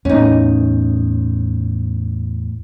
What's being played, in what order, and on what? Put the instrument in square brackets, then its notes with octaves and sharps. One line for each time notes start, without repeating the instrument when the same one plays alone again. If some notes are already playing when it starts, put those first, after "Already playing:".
[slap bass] E2 A2 [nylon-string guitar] C#4 D#4